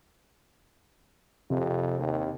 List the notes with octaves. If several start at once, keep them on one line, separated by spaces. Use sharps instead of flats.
F2 C3
D#2